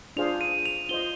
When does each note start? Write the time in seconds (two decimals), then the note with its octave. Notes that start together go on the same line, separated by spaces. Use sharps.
0.17 D4 F4 G#4 C5 F5 F7
0.41 D#7
0.66 F7
0.89 F4 C5 D#5 G7